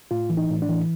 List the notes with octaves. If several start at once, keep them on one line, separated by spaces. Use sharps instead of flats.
A2 F4
E3
D#4
A2
D4
E3